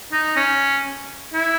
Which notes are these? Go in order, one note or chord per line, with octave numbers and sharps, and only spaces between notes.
D#4
C#4
E4